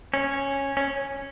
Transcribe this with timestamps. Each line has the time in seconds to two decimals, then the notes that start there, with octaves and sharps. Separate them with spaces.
0.14 C#4
0.77 C#4